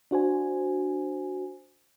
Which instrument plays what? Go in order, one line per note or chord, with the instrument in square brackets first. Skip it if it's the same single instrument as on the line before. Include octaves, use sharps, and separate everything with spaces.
[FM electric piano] D4 F#4 C5 G#5